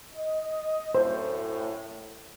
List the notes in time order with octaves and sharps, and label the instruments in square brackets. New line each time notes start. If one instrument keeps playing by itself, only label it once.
[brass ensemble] D#5
[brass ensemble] F#2 A2 [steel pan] C5